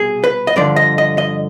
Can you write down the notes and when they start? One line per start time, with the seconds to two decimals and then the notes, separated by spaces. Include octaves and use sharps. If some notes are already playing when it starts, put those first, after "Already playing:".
Already playing: C2 B2 G#4
0.24 B4
0.47 D#5
0.56 G2 D3 F3 D5
0.76 D#5
0.98 D#5
1.18 D#5